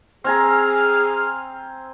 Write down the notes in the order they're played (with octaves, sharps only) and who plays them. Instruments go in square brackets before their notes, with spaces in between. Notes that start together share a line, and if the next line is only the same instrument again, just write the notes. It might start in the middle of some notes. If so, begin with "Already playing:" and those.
[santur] C4 G#5 A#5 [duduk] G#4 [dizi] F6